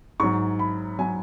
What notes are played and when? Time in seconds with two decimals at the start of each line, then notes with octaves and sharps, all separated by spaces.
0.20 G#2 F#3 C#6
0.59 B5
0.99 F#3 G#5